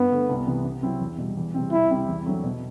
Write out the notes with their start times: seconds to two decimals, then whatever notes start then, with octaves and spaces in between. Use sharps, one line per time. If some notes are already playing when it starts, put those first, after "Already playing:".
Already playing: G2 B3
0.11 D3 A3
0.29 C2
0.47 C3 E3 B3 E4
0.64 C3
0.83 F#3 C4 E4
1.01 E2
1.18 B2 G3
1.37 E2
1.54 C3 G3 C4
1.72 C2 E4
1.91 C3 G3 C4
2.08 E2
2.26 D3 F#3 A3 C4
2.44 B2